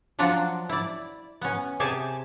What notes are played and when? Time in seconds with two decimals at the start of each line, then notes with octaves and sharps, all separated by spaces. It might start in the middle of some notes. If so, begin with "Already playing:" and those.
0.19 F3 F#3 D4 F4 F#4
0.69 E4 D5
1.41 B3 C#4
1.80 C3 G4 G#4 G#5 A5